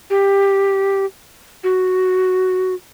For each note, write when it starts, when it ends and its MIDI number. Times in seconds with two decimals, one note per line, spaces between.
0.10 1.05 67
1.64 2.74 66